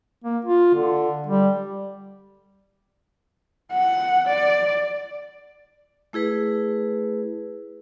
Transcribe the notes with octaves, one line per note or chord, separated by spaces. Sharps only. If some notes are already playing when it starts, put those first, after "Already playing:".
A#3
F4
D3
G3
F#5
D5
A3 E4 G#4 B4